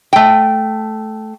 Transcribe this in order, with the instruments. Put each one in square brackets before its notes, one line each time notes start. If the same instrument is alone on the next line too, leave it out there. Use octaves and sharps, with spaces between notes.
[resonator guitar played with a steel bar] A3 G5